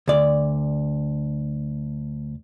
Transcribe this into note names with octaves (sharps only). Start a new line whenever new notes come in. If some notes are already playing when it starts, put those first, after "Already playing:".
D2 D5